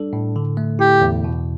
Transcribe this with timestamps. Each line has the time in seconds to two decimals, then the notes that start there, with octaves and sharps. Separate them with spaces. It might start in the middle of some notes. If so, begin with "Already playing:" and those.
Already playing: G3 D4 A4
0.13 A2
0.36 D3
0.57 A3
0.79 E4 G4
1.02 E2
1.24 B2